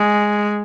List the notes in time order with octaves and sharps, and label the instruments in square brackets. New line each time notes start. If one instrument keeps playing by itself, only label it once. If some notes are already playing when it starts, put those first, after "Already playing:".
Already playing: [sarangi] G#3